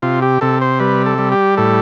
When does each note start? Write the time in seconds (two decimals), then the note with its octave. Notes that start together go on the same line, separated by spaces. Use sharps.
0.02 C3 F4
0.22 G4
0.41 C3 A4
0.61 C5
0.80 G3 B4
1.06 A4
1.18 G3
1.32 G4
1.57 A2 A4